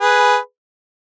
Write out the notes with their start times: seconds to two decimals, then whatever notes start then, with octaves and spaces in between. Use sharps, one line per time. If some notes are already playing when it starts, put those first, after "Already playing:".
0.01 G#4 B4